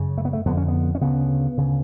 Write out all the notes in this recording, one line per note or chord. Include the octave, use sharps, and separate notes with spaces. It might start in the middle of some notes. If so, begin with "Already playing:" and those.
Already playing: F#2 C#3
A3
B3
A3
F2 D3 B3
C#4
B3
C#4
D2 C#3 B3
D2 C#3